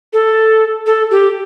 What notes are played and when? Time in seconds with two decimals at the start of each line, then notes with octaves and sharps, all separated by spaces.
0.13 A4
0.86 A4
1.11 G4